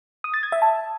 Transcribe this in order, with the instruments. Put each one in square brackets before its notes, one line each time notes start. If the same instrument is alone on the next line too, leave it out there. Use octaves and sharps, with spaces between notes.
[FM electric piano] D#6
A6
G#6
E5
A5